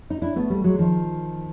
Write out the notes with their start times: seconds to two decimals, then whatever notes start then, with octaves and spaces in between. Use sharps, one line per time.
0.10 D#4
0.22 D4 E4
0.36 A3 B3
0.50 G3 A3
0.64 F#3 G#3
0.79 D#3 F3